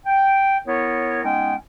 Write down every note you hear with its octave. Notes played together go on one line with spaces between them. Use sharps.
G5
B3 E4 A#4 C#5
G#3 B3 C#4 D#4 G5